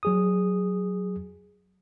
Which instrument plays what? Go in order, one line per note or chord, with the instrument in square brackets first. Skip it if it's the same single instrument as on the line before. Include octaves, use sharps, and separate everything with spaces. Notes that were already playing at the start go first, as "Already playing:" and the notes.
[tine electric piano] F#3 G#4 D#6